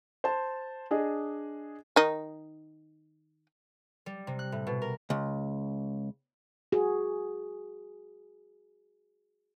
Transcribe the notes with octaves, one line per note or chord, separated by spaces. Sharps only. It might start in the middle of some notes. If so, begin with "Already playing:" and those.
C5 A5
D4 G#4 D#5
D#3 D#4
G3
C3
F#6
A2
B2
A#4
C#2
F#4 G#4